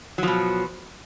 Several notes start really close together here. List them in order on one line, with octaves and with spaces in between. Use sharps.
F#3 F3 B2